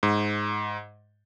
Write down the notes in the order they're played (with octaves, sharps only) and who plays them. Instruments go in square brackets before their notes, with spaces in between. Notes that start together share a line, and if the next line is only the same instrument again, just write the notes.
[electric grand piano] G#2